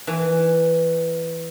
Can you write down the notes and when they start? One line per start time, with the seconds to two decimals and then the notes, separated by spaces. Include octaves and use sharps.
0.07 E3